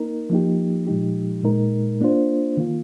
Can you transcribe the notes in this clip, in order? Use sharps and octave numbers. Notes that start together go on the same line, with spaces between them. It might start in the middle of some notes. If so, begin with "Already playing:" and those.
Already playing: A#3 D#4 A#4
F3 A#3 D#4 G4
A#2 F3 G#3 D#4 G4
A#2 G#3 D#4 A#4
A#3 D4 F4 C5
D#3 A#3 F4